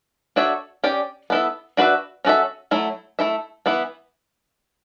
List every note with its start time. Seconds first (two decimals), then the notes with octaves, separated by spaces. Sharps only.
0.36 D4 F#4 A4 C#5 E5
0.84 C#4 G4 D5
1.30 B3 E4 A4 E5
1.77 D4 F#4 B4 E5
2.25 C#4 F#4 A4 E5
2.71 F#3 A3 E4
3.19 A3 E4 A4 E5
3.66 E3 B3 E4 B4